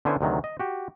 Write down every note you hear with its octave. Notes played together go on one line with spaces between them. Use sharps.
D3 B3 C#4 E4 C5 G#5
D2 C3 D#3 F#3
D#5
F#4 G4